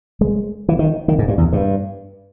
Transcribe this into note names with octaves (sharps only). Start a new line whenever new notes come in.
G#3
E3
D#3
D#3
G#2
G2
E2
G2